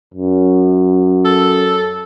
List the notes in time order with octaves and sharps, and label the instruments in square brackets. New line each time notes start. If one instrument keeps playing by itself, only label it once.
[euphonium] F#2
[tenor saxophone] A4